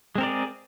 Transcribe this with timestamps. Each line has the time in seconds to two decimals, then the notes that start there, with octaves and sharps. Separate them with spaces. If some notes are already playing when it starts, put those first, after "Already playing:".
0.15 G#3
0.18 C4
0.21 A#4
0.23 D5
0.26 G#4